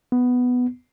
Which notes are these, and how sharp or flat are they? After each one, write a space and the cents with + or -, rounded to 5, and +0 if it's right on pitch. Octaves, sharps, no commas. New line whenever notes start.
B3 +5